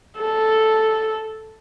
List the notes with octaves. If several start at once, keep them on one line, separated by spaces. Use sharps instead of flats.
A4